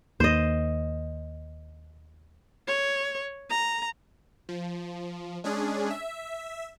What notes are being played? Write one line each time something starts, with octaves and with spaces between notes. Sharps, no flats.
D#2 D#3 A#3 C5 D#5
C#5
A#5
F3
G#3 C#4 D4 G#4
E5